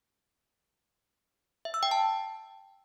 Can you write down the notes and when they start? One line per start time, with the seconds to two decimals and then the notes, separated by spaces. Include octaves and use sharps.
1.65 E5
1.74 E6
1.83 G5
1.91 A5